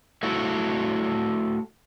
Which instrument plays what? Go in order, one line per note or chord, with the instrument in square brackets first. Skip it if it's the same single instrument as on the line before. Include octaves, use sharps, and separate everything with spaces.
[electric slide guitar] A3 E4 F#4